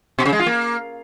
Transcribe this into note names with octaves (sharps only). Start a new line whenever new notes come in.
B2
C#3
G#3
F4
A#3